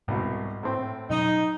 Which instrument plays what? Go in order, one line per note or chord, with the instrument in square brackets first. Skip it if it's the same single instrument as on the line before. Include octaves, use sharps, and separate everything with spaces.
[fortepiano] C2 B2 [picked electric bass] G#2
[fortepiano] A2 C4
[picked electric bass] B2 F#3 C#4 [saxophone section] D#4